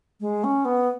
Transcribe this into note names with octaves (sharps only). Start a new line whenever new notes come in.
G#3
C#4
B3